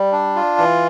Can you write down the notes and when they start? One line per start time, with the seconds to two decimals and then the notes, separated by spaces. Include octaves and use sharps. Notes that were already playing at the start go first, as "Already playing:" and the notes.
Already playing: G3
0.12 D4
0.35 F4
0.58 E3